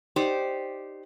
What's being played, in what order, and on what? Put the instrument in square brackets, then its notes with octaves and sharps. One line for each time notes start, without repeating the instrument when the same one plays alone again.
[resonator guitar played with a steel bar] D#4 G4 C5 D5